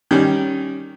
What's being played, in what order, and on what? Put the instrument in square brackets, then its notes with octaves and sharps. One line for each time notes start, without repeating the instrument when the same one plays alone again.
[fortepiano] D#3 G3 C#4